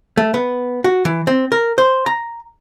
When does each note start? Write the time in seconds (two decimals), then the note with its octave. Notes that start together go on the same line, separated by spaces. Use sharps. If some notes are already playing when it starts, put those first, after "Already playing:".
0.17 A3
0.34 B3
0.84 F#4
1.05 E3
1.27 C4
1.52 A#4
1.78 C5
2.06 A#5